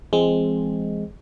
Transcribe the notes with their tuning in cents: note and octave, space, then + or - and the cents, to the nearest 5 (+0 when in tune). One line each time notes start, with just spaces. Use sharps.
E3 +45 G#3 +0 C4 +0